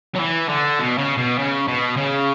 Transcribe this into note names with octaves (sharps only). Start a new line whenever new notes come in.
F#3
E3
D3
B2
C#3
B2
C#3
B2
C#3